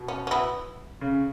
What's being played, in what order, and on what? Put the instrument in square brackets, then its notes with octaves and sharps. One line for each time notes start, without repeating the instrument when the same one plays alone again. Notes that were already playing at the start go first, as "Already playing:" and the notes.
Already playing: [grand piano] B2
[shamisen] C#4
C#4
B3 E4
[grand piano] C#3